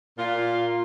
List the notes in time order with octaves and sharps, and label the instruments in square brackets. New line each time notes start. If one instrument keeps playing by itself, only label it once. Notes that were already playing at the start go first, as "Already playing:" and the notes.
[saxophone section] A#2 F4